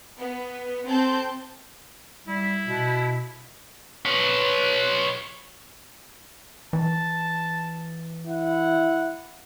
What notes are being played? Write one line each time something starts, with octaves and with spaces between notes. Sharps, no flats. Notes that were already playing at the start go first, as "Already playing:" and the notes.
B3
C4 A4 A5 G6
G3 E4
B2
B4 C#5
E3 A5
E4 F#5